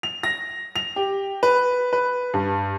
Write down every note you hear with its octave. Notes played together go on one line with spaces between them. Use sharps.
F7
A#6
F7
G4
B4
B4
G2